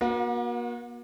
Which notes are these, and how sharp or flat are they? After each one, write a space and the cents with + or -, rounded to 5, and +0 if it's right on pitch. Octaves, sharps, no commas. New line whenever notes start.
A#3 +40 F#4 -30